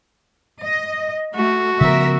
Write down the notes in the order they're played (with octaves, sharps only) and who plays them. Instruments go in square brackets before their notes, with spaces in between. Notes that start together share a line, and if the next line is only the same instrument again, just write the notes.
[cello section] D#5
[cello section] A3 [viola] F#4
[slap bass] C#3 F3 B3 [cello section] A#4 E5